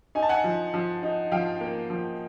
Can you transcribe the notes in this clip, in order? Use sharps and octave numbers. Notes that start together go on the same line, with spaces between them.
D#4 G#5
A5
F#5 G#5
F3
F3
D#4
F3 F5 G5
A#3
F3